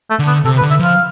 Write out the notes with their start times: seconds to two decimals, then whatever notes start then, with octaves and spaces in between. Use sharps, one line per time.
0.10 A3
0.19 D3
0.27 B3
0.45 C3 A4
0.58 B4
0.62 D3
0.71 E5
0.79 F3 F5